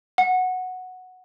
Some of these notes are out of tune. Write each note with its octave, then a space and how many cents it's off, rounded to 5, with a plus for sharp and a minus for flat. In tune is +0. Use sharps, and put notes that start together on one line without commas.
F#5 -5